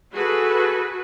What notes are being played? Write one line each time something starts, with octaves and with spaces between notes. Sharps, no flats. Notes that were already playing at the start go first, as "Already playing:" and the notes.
F#4 G#4 A4 B4